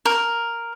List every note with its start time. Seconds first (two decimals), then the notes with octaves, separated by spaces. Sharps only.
0.05 A#4